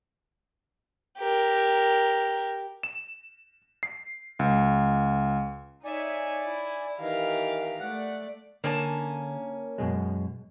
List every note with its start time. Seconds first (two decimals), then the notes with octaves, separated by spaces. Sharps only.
1.18 G4 A#4
2.83 E7
3.83 C7
4.39 C#2
5.85 D#4 C#5 D5 E5 G#5
6.45 E4
7.00 D#3 E3 G4 A#4 F5
7.80 A3 D5 F#5
8.64 D3 A#3 C#4 A5
9.78 F#2 B2 G#3